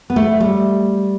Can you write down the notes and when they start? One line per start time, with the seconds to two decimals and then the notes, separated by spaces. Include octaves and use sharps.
0.10 B3
0.16 A3
0.40 G3